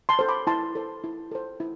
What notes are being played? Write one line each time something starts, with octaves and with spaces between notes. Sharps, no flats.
A5 C6
A4 C5
B5 D6
E4 A5 C6
A4 C5
E4
A4 C5
E4